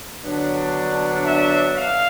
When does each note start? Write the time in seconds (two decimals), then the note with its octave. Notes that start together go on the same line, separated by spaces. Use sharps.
0.23 D3 F#3 B3 D4
1.25 E5
1.76 F5